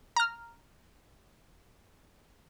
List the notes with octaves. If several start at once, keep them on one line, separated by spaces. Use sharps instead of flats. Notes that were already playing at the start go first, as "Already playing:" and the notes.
A#5 F6